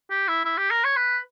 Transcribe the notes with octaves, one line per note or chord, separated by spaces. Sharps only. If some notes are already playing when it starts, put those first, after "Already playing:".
G4
E4
E4
G4
A#4
C#5
B4